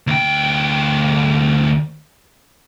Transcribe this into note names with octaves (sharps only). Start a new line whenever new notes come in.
D2 G5